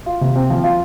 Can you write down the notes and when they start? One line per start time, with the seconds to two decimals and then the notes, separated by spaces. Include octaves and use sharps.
0.06 F4
0.21 C3
0.36 C4
0.50 F3
0.64 F4